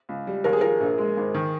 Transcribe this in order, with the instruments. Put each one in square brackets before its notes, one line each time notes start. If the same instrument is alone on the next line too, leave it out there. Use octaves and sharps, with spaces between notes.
[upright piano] C#2
G3
[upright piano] D#2 [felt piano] A#4
[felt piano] G#4
[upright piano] F3 [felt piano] A#4
[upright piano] A#1
G#3
G#1
D#3